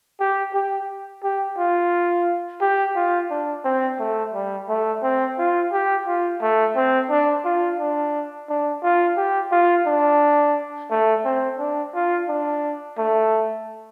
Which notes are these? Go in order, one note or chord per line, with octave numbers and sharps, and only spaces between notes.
G4
G4
G4
F4
G4
F4
D4
C4
A3
G3
A3
C4
F4
G4
F4
A3
C4
D4
F4
D4
D4
F4
G4
F4
D4
A3
C4
D4
F4
D4
A3